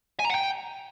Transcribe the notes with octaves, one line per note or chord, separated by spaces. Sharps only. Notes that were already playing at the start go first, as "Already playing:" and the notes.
G#5
A#5
F#5
G5